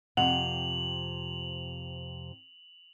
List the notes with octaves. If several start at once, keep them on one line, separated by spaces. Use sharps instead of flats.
F2 C3 F#5 F7 F#7